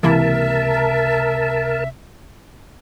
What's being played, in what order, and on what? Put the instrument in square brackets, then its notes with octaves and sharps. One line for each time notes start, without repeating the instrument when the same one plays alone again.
[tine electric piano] C#2 C3 [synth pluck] E3 A#3 E4 [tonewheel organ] A#4 A5 [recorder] E5